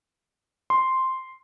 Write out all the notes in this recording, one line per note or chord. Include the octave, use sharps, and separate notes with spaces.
C6